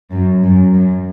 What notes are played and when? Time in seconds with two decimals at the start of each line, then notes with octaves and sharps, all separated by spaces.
0.12 F#2
0.43 F#2
0.74 F#2